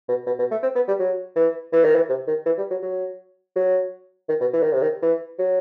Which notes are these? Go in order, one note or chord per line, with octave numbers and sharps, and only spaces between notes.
B2
B2
B2
A3
C4
B3
G3
F#3
E3
E3
D#3
E3
C3
D#3
E3
G3
F#3
F#3
F#3
D#3
B2
E3
D#3
C3
D#3
E3
F#3